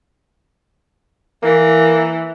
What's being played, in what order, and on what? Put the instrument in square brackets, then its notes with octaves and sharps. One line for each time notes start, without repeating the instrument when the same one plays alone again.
[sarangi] E3 [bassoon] A#3